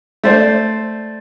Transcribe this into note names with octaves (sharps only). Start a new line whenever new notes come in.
A3 C5 D5